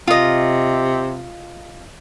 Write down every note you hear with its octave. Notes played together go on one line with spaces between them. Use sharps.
C3 F4 D#5